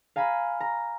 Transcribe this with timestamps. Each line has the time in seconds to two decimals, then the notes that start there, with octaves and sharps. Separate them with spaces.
0.16 F5 G#5 A#5 B5
0.61 A#5